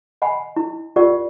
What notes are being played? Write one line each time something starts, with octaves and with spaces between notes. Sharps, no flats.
D#5 F#5 G#5 B5
E4
F4 G4 A#4 D5 F#5